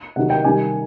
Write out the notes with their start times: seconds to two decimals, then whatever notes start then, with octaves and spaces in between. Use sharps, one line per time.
0.16 C3 D#3 F#3 F#5
0.30 G5
0.44 C3 D#3 G3 G#5